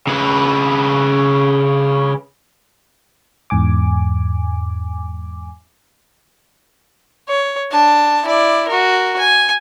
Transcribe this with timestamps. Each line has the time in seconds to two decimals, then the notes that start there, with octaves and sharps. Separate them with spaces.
0.07 C#3 B4
3.50 E2 G#2 G#5 D6
7.29 C#5
7.71 D4 A5
8.25 E4 D5
8.68 F#4 A#4
9.19 G#5